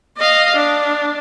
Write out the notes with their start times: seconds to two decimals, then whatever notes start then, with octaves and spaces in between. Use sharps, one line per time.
0.17 D#5 F5
0.55 D4